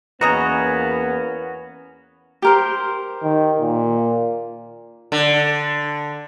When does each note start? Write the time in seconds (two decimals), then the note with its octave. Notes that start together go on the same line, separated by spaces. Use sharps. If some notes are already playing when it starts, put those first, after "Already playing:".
0.21 E2 A#3 B3 C#4 F#4 A#4 D#5 A#5
2.42 G4 A#4 C5
3.23 D#3
3.61 A#2
5.12 D3